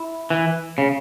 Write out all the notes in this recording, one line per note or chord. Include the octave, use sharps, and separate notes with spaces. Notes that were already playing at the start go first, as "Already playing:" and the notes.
Already playing: E4
E3
C#3